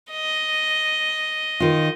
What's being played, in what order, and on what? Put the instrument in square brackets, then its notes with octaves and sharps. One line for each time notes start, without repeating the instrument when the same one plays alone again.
[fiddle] D#5
[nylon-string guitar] D#3 F4